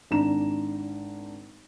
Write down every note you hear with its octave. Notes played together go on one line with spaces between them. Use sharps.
G#1 D4 A#5 E7